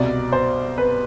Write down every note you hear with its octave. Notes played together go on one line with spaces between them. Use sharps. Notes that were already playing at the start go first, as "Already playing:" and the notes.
Already playing: C2 B2 D5
C5
B4